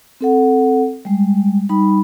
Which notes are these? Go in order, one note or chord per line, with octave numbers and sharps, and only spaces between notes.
C4 A4 F#5
G3 G#3
G3 D#4 B5